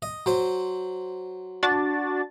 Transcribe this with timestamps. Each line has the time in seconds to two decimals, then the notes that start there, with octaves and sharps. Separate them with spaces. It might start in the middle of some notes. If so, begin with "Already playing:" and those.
0.02 D#5
0.26 F#3 C5
1.63 D4 F#4 A6